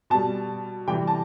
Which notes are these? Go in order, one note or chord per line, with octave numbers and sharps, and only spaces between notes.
B2 G3 A5
C3 E3 G3 G5
A5